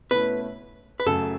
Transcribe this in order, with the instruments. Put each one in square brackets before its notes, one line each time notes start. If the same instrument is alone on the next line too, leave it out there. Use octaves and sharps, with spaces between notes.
[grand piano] B2 A3 C#4 E4 [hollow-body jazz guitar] B4
[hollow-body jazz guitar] B4
[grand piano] F#2 C#3 F#3 A3 [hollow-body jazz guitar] A4